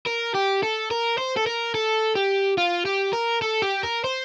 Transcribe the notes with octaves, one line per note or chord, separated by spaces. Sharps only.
A#4
G4
A4
A#4
C5
A4
A#4
A4
G4
F4
G4
A#4
A4
G4
A#4
C5